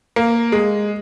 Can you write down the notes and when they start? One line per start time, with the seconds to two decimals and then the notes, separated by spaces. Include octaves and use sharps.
0.16 A#3
0.52 G#3